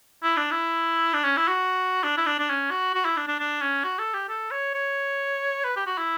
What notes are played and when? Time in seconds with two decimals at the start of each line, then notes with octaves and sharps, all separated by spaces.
0.23 E4
0.37 D4
0.51 E4
1.14 D4
1.25 C#4
1.37 E4
1.48 F#4
2.04 D4
2.17 E4
2.26 D4
2.39 D4
2.50 C#4
2.71 F#4
2.94 F#4
3.05 E4
3.17 D4
3.28 D4
3.40 D4
3.62 C#4
3.84 F#4
3.99 A4
4.14 G4
4.29 A4
4.51 C#5
4.74 C#5
5.64 B4
5.76 G4
5.87 F#4
5.98 E4